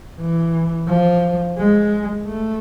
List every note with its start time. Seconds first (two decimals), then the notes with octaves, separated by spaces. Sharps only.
0.20 E3
0.89 F3
1.58 G#3
2.26 A3